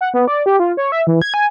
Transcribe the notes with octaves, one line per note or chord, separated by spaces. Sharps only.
F#5
B3
D5
G4
F4
C#5
E5
E3
G#6
G#5